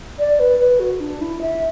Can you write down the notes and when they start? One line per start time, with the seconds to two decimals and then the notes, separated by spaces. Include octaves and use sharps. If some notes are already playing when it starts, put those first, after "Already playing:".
0.19 D5
0.40 B4
0.59 B4
0.80 F#4
1.00 D4
1.21 E4
1.41 E5